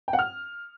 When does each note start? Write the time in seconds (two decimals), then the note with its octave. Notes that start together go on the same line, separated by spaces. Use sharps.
0.08 G5
0.13 F#5
0.19 F6